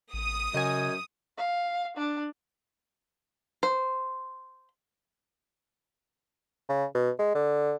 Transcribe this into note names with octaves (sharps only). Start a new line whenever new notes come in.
A1 D#6
F#2 C#3 D#5 G#5
F5
D4
C5
C#3
B2
G#3
D3